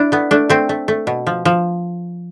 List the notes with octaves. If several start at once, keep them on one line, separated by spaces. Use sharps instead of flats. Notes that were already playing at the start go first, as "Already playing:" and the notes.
Already playing: D4 E4
A3 B3
A3 D4
A3 C4
A3
A3
B2
F3
F3